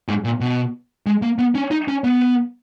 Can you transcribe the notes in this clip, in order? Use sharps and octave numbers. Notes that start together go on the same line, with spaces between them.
G#2
A#2
B2
G#3
A#3
B3
C#4
D#4
C#4
B3